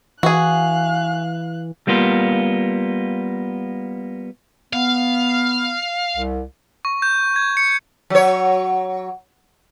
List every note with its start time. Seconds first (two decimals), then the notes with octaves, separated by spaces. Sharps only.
0.23 E3 F#4 G#4 F5 F#6
1.87 G3 A#3 B3 F4
4.73 B3 F5
6.17 C2
6.85 C#6
7.02 G6
7.36 G#6
7.57 C#7
8.10 F#3 C#5